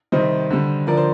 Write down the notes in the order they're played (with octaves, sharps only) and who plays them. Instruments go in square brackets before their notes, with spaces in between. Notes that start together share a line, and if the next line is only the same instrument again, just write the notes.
[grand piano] C3 D#3 G3 C5 D#5
D3 G3
D3 F3 A#4 D5
C5